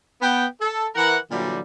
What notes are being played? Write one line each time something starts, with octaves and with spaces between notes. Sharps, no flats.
B3 G5
A4
E3 A#4 F#5
A#2 D3 E3 F#3 G3